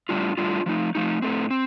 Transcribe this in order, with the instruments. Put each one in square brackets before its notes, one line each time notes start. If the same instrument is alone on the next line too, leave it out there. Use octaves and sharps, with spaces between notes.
[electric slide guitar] A2 G3 D4 F4
A2 G3 D4 F4
F3 A3 D#4
F3 A3 D#4
A2 A3 C4
C4